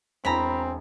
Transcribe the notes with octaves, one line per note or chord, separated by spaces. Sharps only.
E1 C4 E4 G#5 A#5 B5